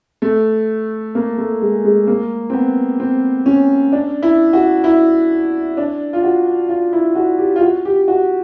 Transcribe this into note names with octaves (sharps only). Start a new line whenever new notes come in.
A3
A#3
A3
G#3
G#3
A#3
C4
B3
C4
C#4
D4
E4
F#4
E4
D4
F4
F#4
F4
E4
F#4
G4
F4
F#4
G4
F#4